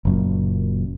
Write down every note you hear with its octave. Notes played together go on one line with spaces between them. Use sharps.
F#1 F#2 A#2